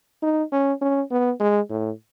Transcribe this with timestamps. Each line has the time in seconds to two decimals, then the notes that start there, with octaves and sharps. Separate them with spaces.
0.23 D#4
0.52 C#4
0.81 C#4
1.11 B3
1.40 G#3
1.70 A2